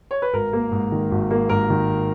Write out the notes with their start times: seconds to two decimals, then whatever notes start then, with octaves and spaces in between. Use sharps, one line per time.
0.11 C#5
0.22 B4
0.33 G#1 A#4
0.53 A#3
0.72 G#2
0.92 D#3
1.11 G#1
1.31 A#3
1.49 G#2 A#4
1.70 D#3